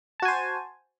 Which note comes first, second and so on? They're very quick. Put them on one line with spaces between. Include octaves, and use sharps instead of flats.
A5 F#4 G#5 C5